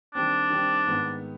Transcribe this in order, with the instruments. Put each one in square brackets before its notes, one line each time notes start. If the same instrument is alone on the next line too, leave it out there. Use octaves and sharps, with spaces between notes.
[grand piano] D#3 G3 C4 [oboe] D4
[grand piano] D#3 G3 C4
G#2 D#3 B3